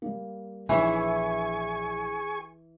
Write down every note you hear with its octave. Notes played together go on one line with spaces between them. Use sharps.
G3 A#3
A#1 E3 E4 G#4 C#5 E5 G#5 C#6